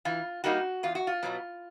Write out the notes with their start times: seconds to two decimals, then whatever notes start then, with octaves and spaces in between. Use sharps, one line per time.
0.05 E3 F4
0.44 G3 A#3 D#4 F#4
0.83 E2 F4
0.95 F#4
1.07 F4
1.23 B2 F#3 B3